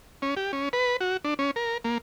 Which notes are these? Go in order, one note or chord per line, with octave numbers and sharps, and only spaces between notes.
C#4
G4
C#4
B4
F#4
D4
C#4
A#4
A#3